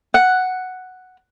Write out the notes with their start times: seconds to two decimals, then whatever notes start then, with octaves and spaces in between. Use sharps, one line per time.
0.14 F#5